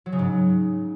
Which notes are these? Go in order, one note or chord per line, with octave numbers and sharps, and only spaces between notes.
F#3
C#3
G#2